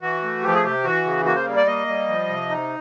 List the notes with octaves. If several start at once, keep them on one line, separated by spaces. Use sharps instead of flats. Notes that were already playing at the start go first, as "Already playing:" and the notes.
E3 F#4
A3
F3 G4
G#4
C3 G4
E3 F#4
C#3
A#3 F#4
C5
G3
D5
A#3 D#5
G3
F3
C3
D#4